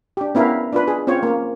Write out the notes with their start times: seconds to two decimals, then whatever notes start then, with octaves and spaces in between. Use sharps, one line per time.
0.17 D4 G4
0.35 B3 C#4 E4 A#4 F5
0.73 D4 F4 B4
0.88 G#4
1.07 C4 C#4 F4 C#5
1.23 A#3 C#4